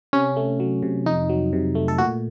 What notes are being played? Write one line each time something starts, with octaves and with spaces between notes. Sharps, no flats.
C3 C#4
A3
F#3
C3
F2 D#4
F#3
C3
A3
A4
A#2 F#4